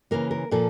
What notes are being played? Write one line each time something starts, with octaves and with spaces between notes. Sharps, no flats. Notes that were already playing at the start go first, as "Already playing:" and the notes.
C#3 E3 A#3 A#4
A#4
A#2 F3 A4